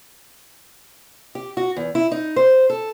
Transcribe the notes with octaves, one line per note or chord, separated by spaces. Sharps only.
G4
F#4
E2
E4
D#4
C5
A4